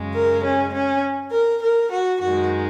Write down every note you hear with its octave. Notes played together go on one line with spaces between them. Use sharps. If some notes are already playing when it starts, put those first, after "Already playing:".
Already playing: F#2 C#3 G#3
A#4
C#4
C#4
A#4
A#4
F#4
F#2 D#3 G#3 F#4